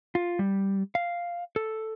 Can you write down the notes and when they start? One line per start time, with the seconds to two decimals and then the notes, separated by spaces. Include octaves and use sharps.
0.15 F4
0.39 G3
0.95 F5
1.56 A4